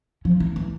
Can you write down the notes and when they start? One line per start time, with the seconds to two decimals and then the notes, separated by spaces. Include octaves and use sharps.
0.25 F3
0.40 E3
0.56 E3